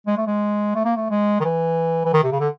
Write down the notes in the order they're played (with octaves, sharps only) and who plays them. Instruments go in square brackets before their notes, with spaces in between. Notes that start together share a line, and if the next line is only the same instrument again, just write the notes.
[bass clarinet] G#3
A3
G#3
A3
A#3
A3
G#3
D#3
E3
E3
D#3
C3
C#3
D3